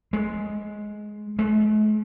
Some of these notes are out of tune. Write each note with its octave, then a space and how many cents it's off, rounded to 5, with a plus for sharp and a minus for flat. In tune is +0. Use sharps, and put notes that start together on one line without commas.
G#3 +10
G#3 +45